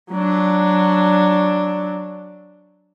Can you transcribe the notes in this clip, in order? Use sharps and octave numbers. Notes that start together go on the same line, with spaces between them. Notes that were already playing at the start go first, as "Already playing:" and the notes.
F#3 D4